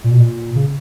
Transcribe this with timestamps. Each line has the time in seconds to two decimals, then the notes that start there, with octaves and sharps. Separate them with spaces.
0.04 A#2
0.11 B2
0.20 A#2
0.56 C#3